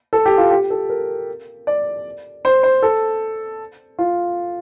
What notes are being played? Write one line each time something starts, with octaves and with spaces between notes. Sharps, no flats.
A4
G4
F4
G4
A4
A#4
D5
C5
C5
A4
F4